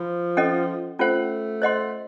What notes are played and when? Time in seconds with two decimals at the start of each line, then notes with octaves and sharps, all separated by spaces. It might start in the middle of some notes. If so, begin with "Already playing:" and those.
Already playing: F3 F4
0.37 C#4 A4 D#5 F#5
0.99 A3 C#4 F4 C5 F#5
1.62 C5 D#5 F#5 C6